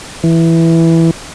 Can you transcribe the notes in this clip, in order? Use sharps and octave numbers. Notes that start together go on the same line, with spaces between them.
E3